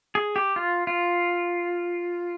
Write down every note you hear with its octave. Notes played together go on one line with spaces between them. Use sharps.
G#4
G4
F4
F4